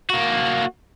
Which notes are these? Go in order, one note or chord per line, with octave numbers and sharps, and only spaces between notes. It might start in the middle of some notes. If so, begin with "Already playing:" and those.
A#3 F#4